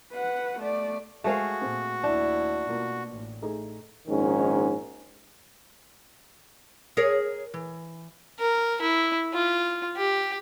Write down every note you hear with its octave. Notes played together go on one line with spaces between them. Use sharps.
B4 F#5
A3 D5
G#3 A3 F#4 G#4 A#4 C5 F5
A#2 C4
D#2 D4 E4
B2 A#3 F4
A1
A3 D#4 G#4
A#1 G#2 D#3 C#4
G#4 A#4 C#5
E3
A#4
E4
F4
G4